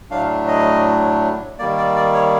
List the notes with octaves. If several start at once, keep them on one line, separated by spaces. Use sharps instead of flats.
A2 F#3 A3 D4 F5
D#5
D#3 G3 A#3 D5
D5
D5
C#5